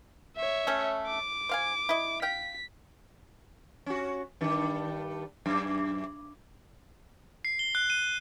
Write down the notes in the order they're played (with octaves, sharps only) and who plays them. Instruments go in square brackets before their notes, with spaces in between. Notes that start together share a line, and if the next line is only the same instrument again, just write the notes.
[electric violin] C#5 E5
[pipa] A3 C#4
[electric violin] D6
[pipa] C5 F5 G#5
E4 D#5
[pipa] F5 G5 [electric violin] B6
[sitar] C#4 F#4
G2 D#3 D4
F#2
[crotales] C7
G7
F#6
D#7